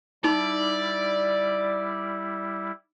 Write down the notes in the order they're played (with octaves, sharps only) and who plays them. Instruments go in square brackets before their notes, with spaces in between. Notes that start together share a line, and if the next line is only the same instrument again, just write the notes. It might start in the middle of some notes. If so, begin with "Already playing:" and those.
[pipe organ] G3 E4 [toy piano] D#4 [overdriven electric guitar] D5